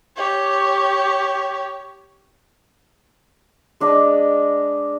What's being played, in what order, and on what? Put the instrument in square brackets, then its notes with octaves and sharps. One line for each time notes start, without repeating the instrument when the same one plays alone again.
[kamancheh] G4 C#5
[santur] G#3 D4 D#5 D6